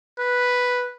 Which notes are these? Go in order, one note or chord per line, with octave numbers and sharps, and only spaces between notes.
B4